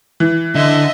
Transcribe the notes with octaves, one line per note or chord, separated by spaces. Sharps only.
E3
D3 D#5 E5